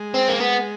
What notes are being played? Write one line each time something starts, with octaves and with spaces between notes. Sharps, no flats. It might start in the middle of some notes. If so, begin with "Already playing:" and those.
Already playing: G#3
C4
A#3
B3